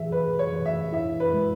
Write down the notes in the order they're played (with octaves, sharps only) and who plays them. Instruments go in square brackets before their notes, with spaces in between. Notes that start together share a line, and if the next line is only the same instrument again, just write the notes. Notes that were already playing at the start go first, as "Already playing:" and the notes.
Already playing: [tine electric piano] E3 G#4 [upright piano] E5
[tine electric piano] E3 [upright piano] B4
[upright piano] C#5
[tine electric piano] E3
[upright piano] E5
[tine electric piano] E4 [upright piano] E5
[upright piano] B4
[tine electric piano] G#3